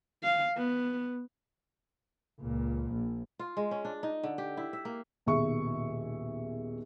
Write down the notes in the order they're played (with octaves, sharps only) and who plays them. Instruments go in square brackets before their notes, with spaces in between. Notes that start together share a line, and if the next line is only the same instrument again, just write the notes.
[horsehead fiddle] F5
B3
[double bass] C#2 A#2
A#1
[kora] F4
G#3
C#4
D4
D#4
D3
G4
E4
E5
A#3
[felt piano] D#1 B1 G#4 E5 C#6